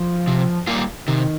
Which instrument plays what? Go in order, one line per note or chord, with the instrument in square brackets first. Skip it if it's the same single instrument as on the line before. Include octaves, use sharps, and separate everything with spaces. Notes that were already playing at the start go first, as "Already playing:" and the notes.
Already playing: [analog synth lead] F3
[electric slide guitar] C3
G3 A#3 F4
[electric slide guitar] C3 [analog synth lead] D#3